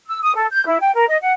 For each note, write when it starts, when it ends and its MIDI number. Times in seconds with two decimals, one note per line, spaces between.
0.08 0.19 88
0.22 0.32 87
0.35 0.46 69
0.51 0.66 91
0.66 0.77 64
0.80 0.91 79
0.95 1.07 70
1.08 1.17 75
1.22 1.33 78